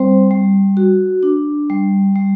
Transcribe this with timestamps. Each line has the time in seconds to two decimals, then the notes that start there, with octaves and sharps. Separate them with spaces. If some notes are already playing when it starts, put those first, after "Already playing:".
Already playing: G3 C4 C5
0.31 G3
0.77 F#4
1.23 D4
1.70 G3
2.16 G3